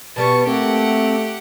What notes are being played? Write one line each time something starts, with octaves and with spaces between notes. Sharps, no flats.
B2 G3 B3 A5 C#6
A3 A#3 C4 G4 F#5